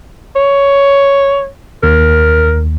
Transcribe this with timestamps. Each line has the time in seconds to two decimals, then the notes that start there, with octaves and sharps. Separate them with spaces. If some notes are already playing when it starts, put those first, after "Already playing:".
0.36 C#5
1.83 D#2 A#4